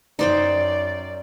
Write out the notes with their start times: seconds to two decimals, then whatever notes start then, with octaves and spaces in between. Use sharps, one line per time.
0.19 F#2 D#4 C5 D5 G5